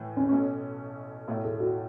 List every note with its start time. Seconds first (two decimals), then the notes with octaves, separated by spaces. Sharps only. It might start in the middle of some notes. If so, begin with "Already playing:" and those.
Already playing: A2 E3 A3
0.17 C#4
0.29 B1 B2 A3 C#4
1.28 B1 A2 A3 E4
1.44 A4
1.60 F#4